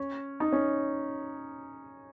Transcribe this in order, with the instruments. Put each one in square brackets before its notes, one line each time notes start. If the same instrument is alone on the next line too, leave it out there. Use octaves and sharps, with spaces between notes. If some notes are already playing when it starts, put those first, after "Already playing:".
Already playing: [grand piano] C#4
D#4
C#4